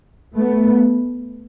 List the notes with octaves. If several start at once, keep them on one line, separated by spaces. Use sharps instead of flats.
A3 B3